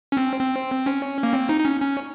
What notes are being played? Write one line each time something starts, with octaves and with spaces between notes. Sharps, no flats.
C#4
C4
C4
C#4
A#3
C4
D#4
D#4
C#4
C#4